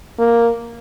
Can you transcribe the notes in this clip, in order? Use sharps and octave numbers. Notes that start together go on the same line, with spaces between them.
A#3